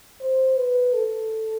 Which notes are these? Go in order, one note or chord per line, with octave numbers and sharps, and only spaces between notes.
C5
B4
A4